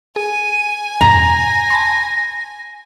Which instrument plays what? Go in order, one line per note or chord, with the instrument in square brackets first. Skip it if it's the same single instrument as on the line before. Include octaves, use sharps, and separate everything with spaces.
[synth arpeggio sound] G#4 [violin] G#5 [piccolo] D#7
[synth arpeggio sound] E2 G2 B2 [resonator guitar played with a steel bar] A#5 [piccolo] A#6
[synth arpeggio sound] A5 B5 C6